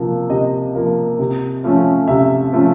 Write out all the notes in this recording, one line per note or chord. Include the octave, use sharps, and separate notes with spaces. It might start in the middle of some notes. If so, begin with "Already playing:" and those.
Already playing: C3 F3 A#3
C3 D#5
F3 A#3
C3
F3 A3 C#4
C3 E5
F3 A3 C#4